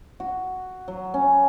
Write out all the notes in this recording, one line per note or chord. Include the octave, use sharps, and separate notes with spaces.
F#4
F#3
C#4